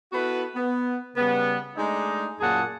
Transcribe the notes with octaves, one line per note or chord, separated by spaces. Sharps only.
B3 E4 F#4 A4 B4
B3
C#3 G3 B3
G#3 A3 D4 D#4
F#2 A#2 G#4 F#5 A5